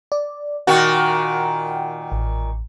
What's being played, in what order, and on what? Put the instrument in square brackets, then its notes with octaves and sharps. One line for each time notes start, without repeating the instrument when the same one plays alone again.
[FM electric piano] D5
[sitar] A#2 D#3 F#4 [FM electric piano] F#5 G5
[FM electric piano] A1